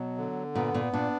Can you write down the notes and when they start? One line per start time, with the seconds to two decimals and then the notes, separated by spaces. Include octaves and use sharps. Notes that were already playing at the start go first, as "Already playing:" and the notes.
Already playing: B2 F#3
0.17 D3
0.55 A#2 B3
0.74 A#2
0.93 A#2 D4